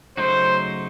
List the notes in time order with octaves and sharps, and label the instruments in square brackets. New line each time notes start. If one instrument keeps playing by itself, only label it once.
[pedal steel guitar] C#3 F#3 A3 D#4 F#4 [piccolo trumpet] C5